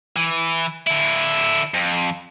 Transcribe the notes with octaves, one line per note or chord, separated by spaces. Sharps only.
E3
D3 E4
F2